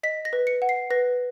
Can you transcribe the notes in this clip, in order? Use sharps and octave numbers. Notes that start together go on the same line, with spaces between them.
D#5 B6
A#6
B4
C#7
F#5
C7
B4 A#6